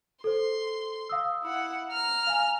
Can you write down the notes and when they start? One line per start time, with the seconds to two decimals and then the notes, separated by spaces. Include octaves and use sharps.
0.24 A4 C5 C6
1.09 F5 D#6 E6
1.43 E4 F#5
1.91 A#5 F6
2.27 F5 G#5